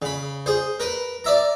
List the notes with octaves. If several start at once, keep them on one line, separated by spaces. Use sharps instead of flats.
C#3 B5
G#4 C5
A#4 B4
D5 E5 A#5